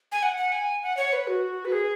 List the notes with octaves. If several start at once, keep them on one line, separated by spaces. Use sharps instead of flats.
G#5
F#5
F#5
G#5
F#5
C#5
B4
F#4
B4
G#4